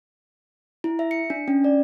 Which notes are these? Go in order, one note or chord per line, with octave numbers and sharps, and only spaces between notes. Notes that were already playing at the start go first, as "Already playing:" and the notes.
E4
E5
C#7
D4
C#4
D5